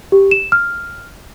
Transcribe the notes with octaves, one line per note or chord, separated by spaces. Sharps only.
G4
E7
F6